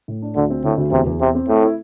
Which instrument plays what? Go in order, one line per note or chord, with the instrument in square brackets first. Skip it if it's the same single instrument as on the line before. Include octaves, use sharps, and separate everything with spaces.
[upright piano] A2
D4
[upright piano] D2 [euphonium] D3
[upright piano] C4
[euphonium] A2 [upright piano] D3
[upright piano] D2
[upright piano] E2 [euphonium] C3
[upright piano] E2
[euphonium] C3 [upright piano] C4
[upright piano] C4
[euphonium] A2 [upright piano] A3
[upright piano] E4